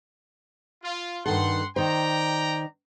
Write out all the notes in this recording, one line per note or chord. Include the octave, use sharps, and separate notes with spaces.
F4
G2 D#3 A4 F#5 C6
D#3 C5 D5 G5 A#5